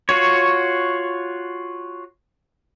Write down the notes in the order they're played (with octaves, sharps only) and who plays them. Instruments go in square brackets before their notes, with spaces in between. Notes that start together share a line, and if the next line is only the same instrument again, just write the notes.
[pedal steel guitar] F4 F#4 C#5